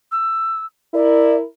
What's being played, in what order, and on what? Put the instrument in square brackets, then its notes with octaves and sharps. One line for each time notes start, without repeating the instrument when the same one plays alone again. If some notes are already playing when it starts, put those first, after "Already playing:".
[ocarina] E6
[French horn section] E4 A#4 [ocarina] D5